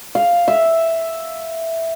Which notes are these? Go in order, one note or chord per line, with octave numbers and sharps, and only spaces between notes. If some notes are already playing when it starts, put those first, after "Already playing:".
F5
E5